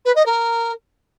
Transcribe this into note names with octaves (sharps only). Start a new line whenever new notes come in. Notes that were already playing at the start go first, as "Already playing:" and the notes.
B4
D#5
A#4